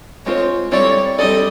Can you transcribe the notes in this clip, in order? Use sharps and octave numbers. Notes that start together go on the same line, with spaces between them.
G#3 C4 F4 A4 C5 C#5
G3 C4 E4 A4 C#5 D5
G3 C4 E4 A4 D5 D#5